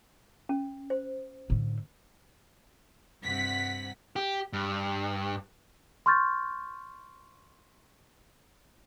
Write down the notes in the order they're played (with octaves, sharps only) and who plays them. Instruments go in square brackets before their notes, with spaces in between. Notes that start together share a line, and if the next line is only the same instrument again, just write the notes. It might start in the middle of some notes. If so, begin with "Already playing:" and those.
[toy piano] C#4
C5
[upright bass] A2 D3
[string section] G2 C3 F#5 B6
[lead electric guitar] G4
G2
[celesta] C6 C#6 F6 G6 A6